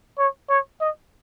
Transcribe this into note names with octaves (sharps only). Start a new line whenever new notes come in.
C#5
C#5
D#5